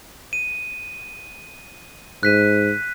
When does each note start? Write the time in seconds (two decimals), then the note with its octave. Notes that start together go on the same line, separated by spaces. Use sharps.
0.33 D#7
2.23 G#2 F#6 B6 D#7